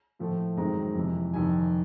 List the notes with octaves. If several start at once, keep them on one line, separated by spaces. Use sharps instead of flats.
A2 F3 A3
F#2 D#3 G#3 C4 A#5
F2 C3 E3
F2 C3 D#3 G3 G#5